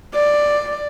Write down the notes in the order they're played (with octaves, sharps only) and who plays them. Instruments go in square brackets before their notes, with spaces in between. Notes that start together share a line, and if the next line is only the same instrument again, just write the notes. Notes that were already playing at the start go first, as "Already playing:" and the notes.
[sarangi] D5